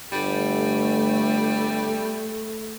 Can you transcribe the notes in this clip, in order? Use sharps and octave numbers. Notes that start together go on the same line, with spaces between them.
G1 G3 A3